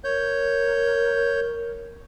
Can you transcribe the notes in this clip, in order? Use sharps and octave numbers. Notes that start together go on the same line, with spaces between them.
A#4 C#5 G6